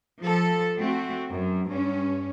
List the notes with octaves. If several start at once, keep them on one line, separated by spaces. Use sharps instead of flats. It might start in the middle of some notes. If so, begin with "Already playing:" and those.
F3 A4
A3 C4 F#4
F#2
G2 C#4